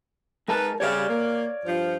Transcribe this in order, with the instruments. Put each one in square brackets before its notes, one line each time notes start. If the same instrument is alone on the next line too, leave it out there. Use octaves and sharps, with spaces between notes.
[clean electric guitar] G#3 A#4 A5 [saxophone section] D#4 B4
[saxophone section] C#3 G3 [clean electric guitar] C#5 D5 F5
[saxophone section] A#3
G2 F3